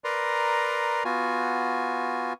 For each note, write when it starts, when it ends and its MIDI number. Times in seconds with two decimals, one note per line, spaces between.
0.04 1.03 70
0.04 1.03 71
0.04 1.03 74
0.04 1.03 82
0.04 1.03 84
1.05 2.33 59
1.05 2.33 65
1.05 2.33 66
1.05 2.33 80